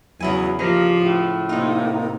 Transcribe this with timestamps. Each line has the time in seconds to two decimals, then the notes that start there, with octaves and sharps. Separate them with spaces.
0.20 E2 C#3 F#3 E4 G#5
0.59 F3 A#3 G4 D#5
0.98 A2
1.49 C3 A#3 D#4 F4